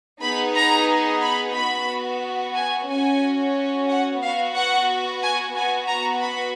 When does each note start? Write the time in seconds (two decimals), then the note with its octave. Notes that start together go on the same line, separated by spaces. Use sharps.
0.22 B3 D#4 G#4 B5
0.55 A#5
1.22 B5
1.55 B3 F#4 B5
2.55 G#5
2.89 C#4 F#4 G#5
3.89 F#5
4.21 B3 F#4 F5
4.56 F#5
5.22 G#5
5.55 B3 F#4 G#5
5.88 A#5
6.21 B5